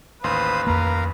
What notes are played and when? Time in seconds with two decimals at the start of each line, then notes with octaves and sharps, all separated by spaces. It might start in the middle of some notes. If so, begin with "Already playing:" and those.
0.24 A1 D#2 B4 C5 F5 C6 D#6
0.67 F2 A#3 A#4 F5 A#5